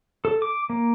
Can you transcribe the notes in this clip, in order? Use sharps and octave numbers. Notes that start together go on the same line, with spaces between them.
A4
D6
A#3